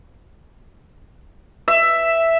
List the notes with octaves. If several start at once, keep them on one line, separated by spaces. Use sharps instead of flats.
E5